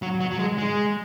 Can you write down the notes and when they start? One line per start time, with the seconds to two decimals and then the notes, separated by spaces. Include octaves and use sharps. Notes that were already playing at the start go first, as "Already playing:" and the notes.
0.02 F#3
0.20 F#3
0.31 F#3
0.39 G#3
0.58 G#3